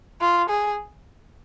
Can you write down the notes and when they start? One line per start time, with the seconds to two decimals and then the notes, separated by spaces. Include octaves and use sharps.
0.21 F4
0.50 G#4